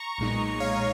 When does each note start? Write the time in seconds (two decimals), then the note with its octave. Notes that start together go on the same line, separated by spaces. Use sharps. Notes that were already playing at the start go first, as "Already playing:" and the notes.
Already playing: A#5 C#6
0.18 B1 A#2 G#3 D#4
0.60 C#5 F5